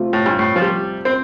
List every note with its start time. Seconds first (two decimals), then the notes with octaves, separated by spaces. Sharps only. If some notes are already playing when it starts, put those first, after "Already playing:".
Already playing: C3 A3 C4 F4
0.13 A2
0.26 G2
0.39 A2
0.56 F3
0.62 G3
1.05 C4